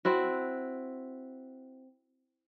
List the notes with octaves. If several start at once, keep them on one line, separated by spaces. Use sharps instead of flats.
C4 E4 F#4